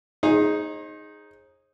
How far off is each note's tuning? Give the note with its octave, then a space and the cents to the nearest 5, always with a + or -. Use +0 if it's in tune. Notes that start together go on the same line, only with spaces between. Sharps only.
D#4 +0 G#4 +0 C5 +45